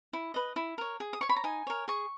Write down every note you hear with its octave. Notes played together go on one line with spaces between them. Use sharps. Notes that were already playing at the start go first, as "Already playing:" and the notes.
E4
B4 D#5
E4
A#4 C#5
G#4
D#6
C#5 C#6
B5
A#5
D#4 G#5
A#4 C#5
G#4 C#6